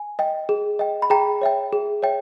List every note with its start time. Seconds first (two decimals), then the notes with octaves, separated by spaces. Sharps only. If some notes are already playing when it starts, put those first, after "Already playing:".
Already playing: G#5
0.19 D#5 G5
0.49 G#4
0.79 D#5 G5
1.02 B5
1.10 G#4 G5 A#5
1.41 C#5 E5 G5
1.73 G#4
2.03 C#5 E5 G5